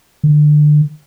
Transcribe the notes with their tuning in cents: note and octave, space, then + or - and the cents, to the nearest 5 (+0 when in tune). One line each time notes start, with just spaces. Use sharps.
D3 +25